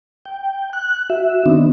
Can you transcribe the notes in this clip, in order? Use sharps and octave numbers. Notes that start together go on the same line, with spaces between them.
G5
F#6
F#4 E5
D#3 B3 C4 D4 D#4